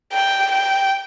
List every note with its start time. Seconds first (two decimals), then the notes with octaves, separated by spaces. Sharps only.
0.12 G5
0.51 G5